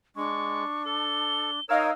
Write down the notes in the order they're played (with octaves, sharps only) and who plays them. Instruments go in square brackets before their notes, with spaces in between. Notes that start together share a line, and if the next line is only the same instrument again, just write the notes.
[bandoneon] G#3 [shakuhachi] D4 [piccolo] C#6
[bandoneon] A4 [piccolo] G7
[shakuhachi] D#4 [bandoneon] A#4 C#5 [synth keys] D#5 F5 E6